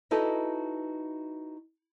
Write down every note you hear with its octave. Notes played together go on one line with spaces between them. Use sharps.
D#4 E4 F#4 A4 B4 D#5